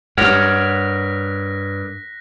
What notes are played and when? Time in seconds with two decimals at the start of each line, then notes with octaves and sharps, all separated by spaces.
0.18 G2 A#4 C#5 F#5 F#6 A#6 B6